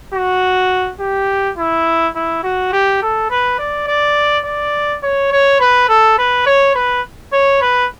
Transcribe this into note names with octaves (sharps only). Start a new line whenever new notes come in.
F#4
G4
E4
E4
F#4
G4
A4
B4
D5
D5
D5
C#5
C#5
B4
A4
B4
C#5
B4
C#5
B4